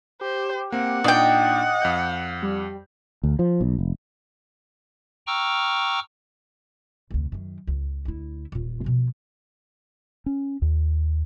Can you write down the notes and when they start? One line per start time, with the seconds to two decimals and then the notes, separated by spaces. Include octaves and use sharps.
0.21 G4 C5
0.72 A#3 C4 F#5
1.04 A#2 D4 D#4 D5 D#5 G5
1.82 F2 F5 G6
2.42 G3
3.23 D2
3.39 F3
3.61 B1
3.79 F1
5.27 G5 A#5 C#6 D6 E6 F6
7.11 F1 D2
7.32 F#2 D#3
7.67 C#2
8.05 D2 E4
8.52 D#1 F4
8.84 B2 F3
10.26 C#4
10.62 D#2